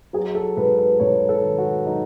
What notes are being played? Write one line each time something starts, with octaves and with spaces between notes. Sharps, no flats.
F#3 G#4
A4
G#2 B4
B4
G#2 C#5
A4
D#3
F#4
F#3 D#4